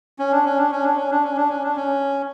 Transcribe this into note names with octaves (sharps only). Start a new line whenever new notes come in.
C#4
D4
C#4
D4
C#4
D4
C#4
D4
C#4
D4
C#4
D4
C#4